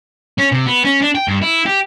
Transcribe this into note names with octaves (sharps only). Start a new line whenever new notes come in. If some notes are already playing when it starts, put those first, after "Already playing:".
C#4
C3
B3
C#4
D4
G5
G2
E4
G4